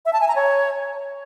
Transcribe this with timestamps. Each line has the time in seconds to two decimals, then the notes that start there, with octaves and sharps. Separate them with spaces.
0.06 E5
0.13 A5
0.21 G#5
0.28 A#5
0.36 C#5